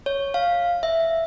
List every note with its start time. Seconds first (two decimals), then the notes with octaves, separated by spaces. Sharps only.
0.06 C#5
0.34 F5
0.83 E5